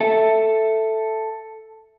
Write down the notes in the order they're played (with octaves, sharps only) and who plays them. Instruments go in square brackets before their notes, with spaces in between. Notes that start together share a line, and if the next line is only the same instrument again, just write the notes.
[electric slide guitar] A4 E5